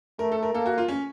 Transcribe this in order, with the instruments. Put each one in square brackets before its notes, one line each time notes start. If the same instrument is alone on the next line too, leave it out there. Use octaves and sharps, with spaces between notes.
[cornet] A3 [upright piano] A#4
[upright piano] A4
A#4
[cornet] A#3 [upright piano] A4
[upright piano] F#4
F4
C#4